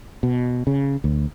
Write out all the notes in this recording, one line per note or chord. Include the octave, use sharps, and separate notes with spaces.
B2
C#3
D2